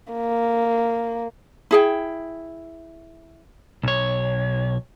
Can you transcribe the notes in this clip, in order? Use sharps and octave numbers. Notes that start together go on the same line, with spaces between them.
A#3
E4 G#4 G5
B1 C#5